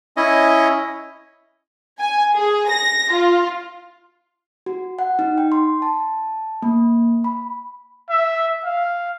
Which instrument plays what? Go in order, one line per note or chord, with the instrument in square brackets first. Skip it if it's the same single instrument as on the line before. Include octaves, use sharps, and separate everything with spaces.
[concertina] C#4 E4 D#5
[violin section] G#5
G#4
A#6
F4
[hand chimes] F#4
F#5
D#4
G5
C6
A5
A#3
B5
[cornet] E5
F5